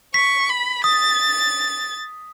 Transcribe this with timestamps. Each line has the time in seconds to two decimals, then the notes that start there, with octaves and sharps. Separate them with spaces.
0.14 C#6 B6
0.49 B5
0.84 D#6 A6